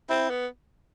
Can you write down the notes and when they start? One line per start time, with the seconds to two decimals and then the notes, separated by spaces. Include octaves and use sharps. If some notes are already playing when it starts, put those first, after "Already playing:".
0.09 C4 E4
0.30 B3